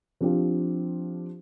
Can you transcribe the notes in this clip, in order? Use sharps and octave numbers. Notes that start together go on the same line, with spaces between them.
F3 C4 D4 F4 G4